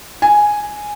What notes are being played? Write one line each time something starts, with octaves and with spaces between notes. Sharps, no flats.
G#5